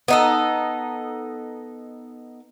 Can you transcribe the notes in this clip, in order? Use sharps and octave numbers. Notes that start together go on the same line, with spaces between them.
B3 D#4 A4